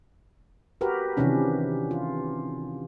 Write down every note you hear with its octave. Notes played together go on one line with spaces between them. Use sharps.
F#4 G4 A#4 B4
C3 D#3 E3 C#4 D4
F4